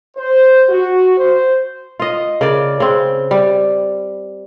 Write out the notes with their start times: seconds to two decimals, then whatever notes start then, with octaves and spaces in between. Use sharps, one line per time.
0.17 C5
0.69 F#4
1.18 C5
2.00 F4 D#5
2.41 C#3 A#4 D5
2.80 C#3 C4
3.31 G3